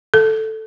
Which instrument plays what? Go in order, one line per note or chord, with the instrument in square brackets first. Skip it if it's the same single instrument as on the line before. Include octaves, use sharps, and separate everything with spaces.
[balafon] A4